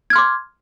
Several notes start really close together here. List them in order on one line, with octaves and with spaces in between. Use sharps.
G#6 F6 C6 D6